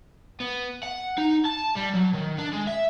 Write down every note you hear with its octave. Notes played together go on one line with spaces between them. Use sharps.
B3
F#5
D#4
A5
G3
F#3
D#3
D4
G#3
E5